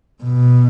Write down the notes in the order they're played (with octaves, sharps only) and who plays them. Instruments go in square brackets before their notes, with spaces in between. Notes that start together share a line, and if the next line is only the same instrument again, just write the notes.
[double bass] B2